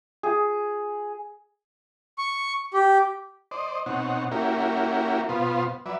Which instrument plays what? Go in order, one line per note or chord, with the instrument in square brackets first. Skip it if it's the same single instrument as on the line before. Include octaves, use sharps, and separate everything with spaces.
[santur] G#4
[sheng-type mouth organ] C#6
G4
[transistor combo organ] C5 D5 D#5
B2 C4 D#4 C#5 F#5
A#3 C#4 E4 F#4 G4 A#4
B2 B3 F4 C5
F#3 B4 D5 E5